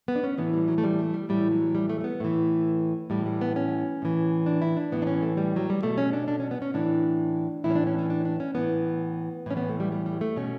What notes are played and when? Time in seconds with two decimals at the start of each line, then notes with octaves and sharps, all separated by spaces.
0.08 B3
0.15 D4
0.24 C#4
0.38 A2 E3 B3
0.54 G3
0.68 F#3
0.78 A3
0.84 G3
0.99 A3
1.14 G3
1.29 A2 E3 G3
1.51 F#3
1.75 G3
1.89 A3
2.01 A3
2.04 B3
2.20 A2 E3 A3
3.10 A2 E3 G3
3.26 G3
3.41 B3
3.56 C#4
4.02 A2 E3
4.46 D4
4.62 E4
4.77 D4
4.92 A2 E3 B3
5.02 D4
5.07 C#4
5.22 A3
5.37 G3
5.56 F#3
5.70 G3
5.83 B2 A3
5.98 C#4
6.13 D4
6.28 D4
6.40 C#4
6.51 B3
6.62 C#4
6.74 A2 E3 D4
7.64 A2 E3 E4
7.70 C#4
7.75 D4
7.87 C#4
7.99 C#4
8.10 D4
8.25 D4
8.40 C#4
8.55 A2 E3 B3
9.46 A2 E3 C#4
9.57 B3
9.69 A3
9.80 G3
9.92 G3
10.06 G3
10.21 A3
10.36 B2 C#4